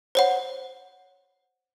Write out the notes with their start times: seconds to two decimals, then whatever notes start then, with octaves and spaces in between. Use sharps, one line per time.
0.15 C5 C#5 F#5